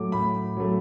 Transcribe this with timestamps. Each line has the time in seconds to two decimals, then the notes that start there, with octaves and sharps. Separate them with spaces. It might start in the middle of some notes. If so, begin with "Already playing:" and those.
Already playing: A2 F#3 A3 D6
0.12 A2 B5
0.57 F#3 A3